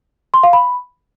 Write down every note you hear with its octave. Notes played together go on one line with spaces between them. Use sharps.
C6
F5
B5